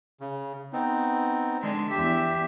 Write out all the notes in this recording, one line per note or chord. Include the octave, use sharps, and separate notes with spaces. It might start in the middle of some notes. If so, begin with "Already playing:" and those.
C#3
B3 C4 D#4
D3 G#3
E2 G4 E5